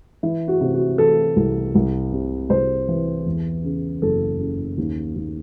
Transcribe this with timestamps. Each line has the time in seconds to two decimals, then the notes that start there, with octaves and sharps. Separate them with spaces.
0.23 E3 E4
0.48 F#4
0.61 C3
0.74 F#4
0.98 E3 A4
1.36 C2
1.75 C2
2.12 C3
2.50 C2 C5
2.88 E3
3.26 E2
3.64 C#3
4.02 F#1 A4
4.40 C#3
4.77 D#2
5.16 D#2